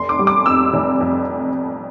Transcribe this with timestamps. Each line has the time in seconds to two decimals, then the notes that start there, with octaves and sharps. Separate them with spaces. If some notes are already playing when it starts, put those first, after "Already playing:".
Already playing: F1 C6
0.09 D6
0.19 G3
0.27 D6
0.46 F2 E6
0.74 F1
1.01 F2